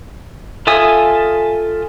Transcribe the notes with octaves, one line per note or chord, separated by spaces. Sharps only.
F4 A4 E5 G#5 D#6